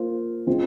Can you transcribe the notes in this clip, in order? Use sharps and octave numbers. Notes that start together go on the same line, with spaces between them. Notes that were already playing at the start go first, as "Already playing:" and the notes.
Already playing: A#3 F4 C5
C#3 G#3 C4 F4 C5